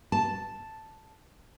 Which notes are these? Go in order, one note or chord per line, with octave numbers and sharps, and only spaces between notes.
A5